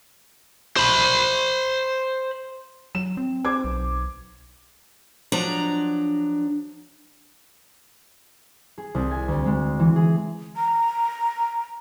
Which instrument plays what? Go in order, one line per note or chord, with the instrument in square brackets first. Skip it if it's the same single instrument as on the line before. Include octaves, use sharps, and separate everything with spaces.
[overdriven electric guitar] C5 B5
[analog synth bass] F#3 [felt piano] E7
[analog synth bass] C4
[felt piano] C5 D6 G#6
[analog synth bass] B1
[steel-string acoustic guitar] F3 F#3 D4 A#5
[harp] G#4
C2
G#5
D2
G#3
E3
G#4
[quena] A#5